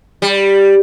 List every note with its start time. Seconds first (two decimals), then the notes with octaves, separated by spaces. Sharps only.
0.22 G3